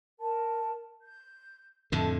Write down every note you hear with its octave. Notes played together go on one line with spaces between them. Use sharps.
A#4 A5
G6
F2 A2 D3 A4 E5 A5